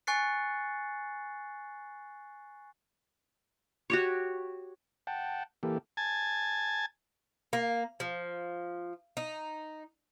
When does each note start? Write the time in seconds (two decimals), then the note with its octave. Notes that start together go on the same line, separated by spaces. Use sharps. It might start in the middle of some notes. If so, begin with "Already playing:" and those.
0.07 G#5 C#6 F#6 A6 C7 C#7
3.90 F#4 G4 C#5
5.07 F#5 G5 A5
5.63 E3 A#3 G4 A4
5.97 G#5 A5
7.53 A#3
8.00 F3
9.17 D#4